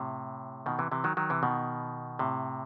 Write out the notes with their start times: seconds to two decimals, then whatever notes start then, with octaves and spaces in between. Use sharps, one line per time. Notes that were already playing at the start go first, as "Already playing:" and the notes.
Already playing: A2 C3
0.66 B2 D#3
0.79 C3 E3
0.92 C3 E3
1.04 D#3 F#3
1.17 D#3 F#3
1.30 C3 E3
1.43 B2 D#3
2.19 A2 C3